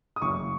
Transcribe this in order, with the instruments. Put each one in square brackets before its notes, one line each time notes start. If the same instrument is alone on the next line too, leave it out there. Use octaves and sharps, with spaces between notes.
[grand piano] D#6
F#1 C#6